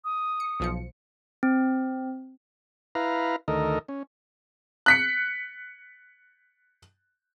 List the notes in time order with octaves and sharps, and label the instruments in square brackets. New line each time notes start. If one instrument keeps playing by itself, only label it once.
[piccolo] D#6
[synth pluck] C#7
B1 F3 C#7
[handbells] C4
[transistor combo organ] E4 B4 F5 A#5
D2 D#3 A4 A#4 D#5
C#4
[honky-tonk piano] F#6 B6 C#7